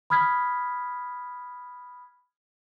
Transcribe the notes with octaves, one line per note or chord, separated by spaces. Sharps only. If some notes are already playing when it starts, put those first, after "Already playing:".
B5 D#6 F6 G#6 B6